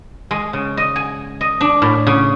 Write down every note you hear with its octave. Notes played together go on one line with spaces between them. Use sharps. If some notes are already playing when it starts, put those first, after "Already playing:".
G#3
C#3
D#5
G#5
D#5
D4
A2
C#3